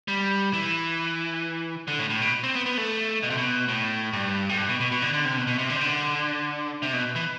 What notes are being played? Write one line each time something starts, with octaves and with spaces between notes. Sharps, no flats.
G3
E3
D3
A2
A2
B2
C4
B3
B3
A3
B2
C3
B2
A2
G2
A2
G2
B2
B2
B2
D3
D3
C3
B2
B2
C3
D3
C3
D3
C3
B2
E3